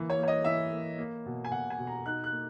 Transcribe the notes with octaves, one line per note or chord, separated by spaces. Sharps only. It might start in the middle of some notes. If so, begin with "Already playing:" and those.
Already playing: E3 A#3
C#5
A#3
C#5
D#5
E3 E5
A#3
A#3
B2
G#5
B2 F#5
G#5
B2
A#5
D#4 F#6
F#6
A#3